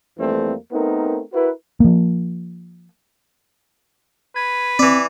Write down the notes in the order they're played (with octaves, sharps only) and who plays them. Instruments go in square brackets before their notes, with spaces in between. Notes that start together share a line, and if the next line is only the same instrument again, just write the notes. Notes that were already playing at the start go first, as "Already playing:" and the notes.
[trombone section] F2 E3 G3 A3 A#3 C4
A3 B3 C4 D#4 A#4
E4 F#4 A#4 B4
[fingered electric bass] F3 A#3
[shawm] B4 [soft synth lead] G#6
[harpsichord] E3 D5 [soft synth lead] C4